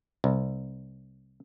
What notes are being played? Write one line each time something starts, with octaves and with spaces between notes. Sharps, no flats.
C2